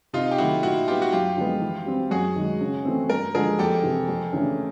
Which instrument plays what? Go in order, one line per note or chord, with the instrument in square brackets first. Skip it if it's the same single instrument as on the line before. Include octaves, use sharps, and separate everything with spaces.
[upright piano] C3 [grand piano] D#4 F4
[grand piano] G4
[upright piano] D#3 F#3 A3 [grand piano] E4 F#4
[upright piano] A#2 [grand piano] E4 F#4
[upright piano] G3 B3 [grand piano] F4 G4
[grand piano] F#4
[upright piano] F#2 [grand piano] F4 G4
[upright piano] D3 F3 G#3 B3
E3
G3 C4
[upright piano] F#2 [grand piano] F#4 G#4
[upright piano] D#3 G#3
C#3
E3 A3 C4
[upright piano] G2 [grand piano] A#4
[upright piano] D3 F3 G#3 [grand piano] G#4 A#4
[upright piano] F2 [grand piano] G4 A4
[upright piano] C3 E3
F2
C#3 E3 A3 D4